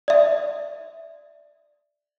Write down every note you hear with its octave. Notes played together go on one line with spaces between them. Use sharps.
D5 E5